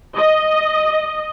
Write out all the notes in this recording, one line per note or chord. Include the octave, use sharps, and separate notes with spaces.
D#5